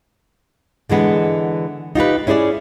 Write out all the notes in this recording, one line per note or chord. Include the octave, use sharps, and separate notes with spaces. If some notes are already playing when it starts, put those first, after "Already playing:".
D3 E3 G#3 B3
D#4 F4 G4 B4
C#4 E4 G#4 C5 D5